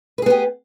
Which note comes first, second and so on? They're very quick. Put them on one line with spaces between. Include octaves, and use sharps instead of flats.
B4 G#4 B3 G4